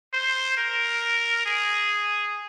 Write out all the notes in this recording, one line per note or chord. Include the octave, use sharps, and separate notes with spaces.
C5
A#4
G#4